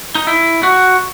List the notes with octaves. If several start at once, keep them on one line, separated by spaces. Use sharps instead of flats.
D#4
E4
F#4